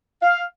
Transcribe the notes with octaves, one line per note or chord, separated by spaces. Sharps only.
F5